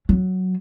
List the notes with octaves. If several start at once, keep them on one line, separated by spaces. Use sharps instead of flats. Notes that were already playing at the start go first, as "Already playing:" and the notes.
F#3